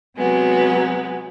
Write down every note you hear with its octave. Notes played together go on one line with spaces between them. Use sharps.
C3 F#3 G#3 B3